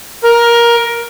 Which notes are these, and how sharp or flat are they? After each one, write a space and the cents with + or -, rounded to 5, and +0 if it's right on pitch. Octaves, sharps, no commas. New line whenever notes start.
A#4 +15